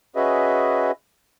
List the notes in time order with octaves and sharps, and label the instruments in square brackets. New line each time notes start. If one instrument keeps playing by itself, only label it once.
[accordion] C#4 F#4 G#4 B4 D#5 E5